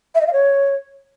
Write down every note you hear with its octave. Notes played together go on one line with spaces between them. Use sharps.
E5
D#5
F5
C#5